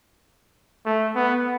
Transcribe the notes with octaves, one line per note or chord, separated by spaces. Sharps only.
A3
B3